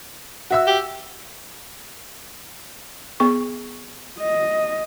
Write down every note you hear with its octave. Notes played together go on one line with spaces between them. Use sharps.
F#4 E5 E6
G4
B3 G#4 C#6
D#5